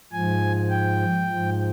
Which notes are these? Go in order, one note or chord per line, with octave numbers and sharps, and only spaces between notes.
G#2 F3 G#5
G5
G#2 F3